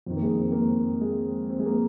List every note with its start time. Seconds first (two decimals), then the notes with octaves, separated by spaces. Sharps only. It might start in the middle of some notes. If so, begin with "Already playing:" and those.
0.06 F2 D#3
0.16 A#3
0.22 G#3
0.39 C4
0.52 A#3
0.66 C4
1.01 G#3
1.50 C4
1.59 G#3
1.66 A#3